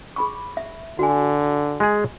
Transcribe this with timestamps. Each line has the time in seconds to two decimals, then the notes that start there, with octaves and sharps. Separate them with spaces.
0.16 G#4 B5 C#6
0.57 E5
0.99 D3 F#4 G#5
1.80 G#3 G#4